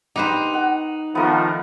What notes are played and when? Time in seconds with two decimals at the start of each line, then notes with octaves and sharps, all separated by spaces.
0.16 D#4 G4 B4 C5
0.54 F#5
1.15 D#3 F3 A3 B3 A#4